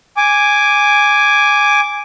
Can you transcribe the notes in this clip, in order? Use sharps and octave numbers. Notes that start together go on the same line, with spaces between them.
G#5 D6